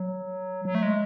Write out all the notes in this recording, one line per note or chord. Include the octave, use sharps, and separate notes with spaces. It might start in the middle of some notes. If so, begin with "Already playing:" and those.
Already playing: F#3
F#3
A3
G#3